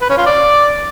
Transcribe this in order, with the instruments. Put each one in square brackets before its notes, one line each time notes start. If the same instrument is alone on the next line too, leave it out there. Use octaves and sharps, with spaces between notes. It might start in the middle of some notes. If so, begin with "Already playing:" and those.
[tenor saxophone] B4
C#4
F4
D5